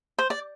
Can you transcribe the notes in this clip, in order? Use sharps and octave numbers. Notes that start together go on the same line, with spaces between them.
C5
D5